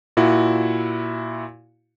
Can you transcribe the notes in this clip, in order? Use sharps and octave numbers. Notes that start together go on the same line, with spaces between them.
A#2 E4 F#4